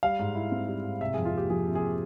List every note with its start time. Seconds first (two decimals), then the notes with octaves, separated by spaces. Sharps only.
0.03 G3 F5
0.19 G#2
0.35 E4
0.52 C4
0.68 G3
0.84 G#2
1.01 C3 E5
1.14 F2 G#4
1.25 F4
1.35 A#3 G4
1.50 F3 G#4
1.67 C3
1.75 G#4